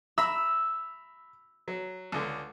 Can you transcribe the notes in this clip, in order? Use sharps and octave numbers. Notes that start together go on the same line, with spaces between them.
E5 A#5 B5 E6
F#3
C#2 D3